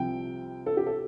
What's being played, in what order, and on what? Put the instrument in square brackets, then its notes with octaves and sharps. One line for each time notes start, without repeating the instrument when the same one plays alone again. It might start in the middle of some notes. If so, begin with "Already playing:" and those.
Already playing: [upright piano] C2 C3 F3 G5
A4
G4
A4